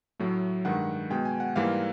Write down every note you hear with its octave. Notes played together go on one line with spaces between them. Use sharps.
A2 F#3 A3
G2 D#3 G#3 F#5
B2 G#3 G5
G#5
F#5
G#2 E3 G3 A#3 F5